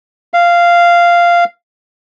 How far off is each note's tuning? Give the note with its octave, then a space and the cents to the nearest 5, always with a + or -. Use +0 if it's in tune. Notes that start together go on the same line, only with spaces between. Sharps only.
F5 -10